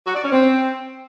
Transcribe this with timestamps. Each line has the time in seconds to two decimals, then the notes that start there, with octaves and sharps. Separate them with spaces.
0.06 F#4
0.15 D5
0.23 C#4
0.32 C4